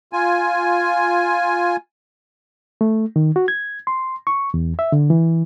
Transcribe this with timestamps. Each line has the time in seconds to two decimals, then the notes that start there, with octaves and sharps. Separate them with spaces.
0.13 F4 G#5
2.81 A3
3.16 D#3
3.36 F#4
3.48 G#6
3.87 C6
4.27 C#6
4.54 E2
4.79 E5
4.92 D3
5.10 E3